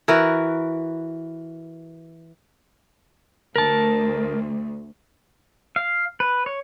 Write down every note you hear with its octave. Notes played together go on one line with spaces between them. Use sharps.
E3 F#4 A#4 B4
D2 A#4 A5
F5
B4
C#5